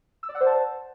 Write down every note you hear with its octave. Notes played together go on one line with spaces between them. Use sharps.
E6
D5
F#5
C5
A5